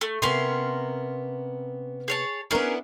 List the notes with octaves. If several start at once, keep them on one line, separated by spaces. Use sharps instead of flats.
A3
C3 B3 C#4 A#4 C6
G#4 C#5 A5
B3 C#4 D4 E4 G#4 A#4